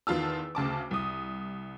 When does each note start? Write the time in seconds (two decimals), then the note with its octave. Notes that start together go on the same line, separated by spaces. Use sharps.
0.07 E2 D#3 F4 A5 E6
0.55 D2 C#3 A5 D6
0.91 C2 D#6